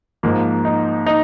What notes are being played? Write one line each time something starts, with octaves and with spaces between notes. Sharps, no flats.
G#2 F3 A#3
D#4
D#4